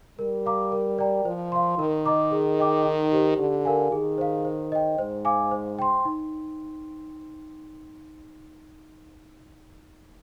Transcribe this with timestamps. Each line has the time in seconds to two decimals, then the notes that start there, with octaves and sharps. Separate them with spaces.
0.19 G3 A#4
0.46 F5 A#5 D6
0.72 A#4
0.98 D5 G5 A#5
1.25 F3 C5
1.52 F5 C6
1.79 D#3 A#4
2.06 D#5 A#5 D6
2.31 G#4
2.59 D#5 G5 D6
2.85 D#4
3.12 G4 C5
3.38 D3 G4
3.65 A#4 F5 G#5
3.91 D#3 G#4
4.18 C5 F5
4.45 C5
4.72 D#5 G5
4.99 G#2 C5
5.25 F5 G#5 D6
5.51 C5
5.79 G5 C6
6.05 D#4